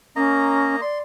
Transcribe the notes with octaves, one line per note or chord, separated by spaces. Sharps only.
A#3 C#4 D#5 A#5
D5 C6